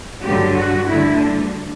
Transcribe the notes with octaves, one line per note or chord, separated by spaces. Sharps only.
G2 D3 F#3 G4
F#4
D2 D3 G3 E4
D4